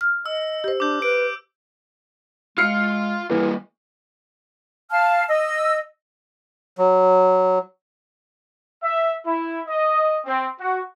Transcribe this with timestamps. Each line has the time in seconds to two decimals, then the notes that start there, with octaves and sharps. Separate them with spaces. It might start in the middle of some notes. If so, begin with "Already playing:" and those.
0.01 F6
0.26 D#5 E6
0.64 G4 C5
0.80 D4 D6 G6
1.02 B4 D7
2.58 G#3 F4 F5 F6 C7 C#7
3.30 E3 G3 A#3
4.90 F5 A5 F6
5.28 D#5 E6
6.78 F#3
8.82 E5
9.26 E4
9.67 D#5
10.26 C4
10.59 F#4